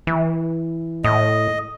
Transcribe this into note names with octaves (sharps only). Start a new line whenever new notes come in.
E3
A2 D#5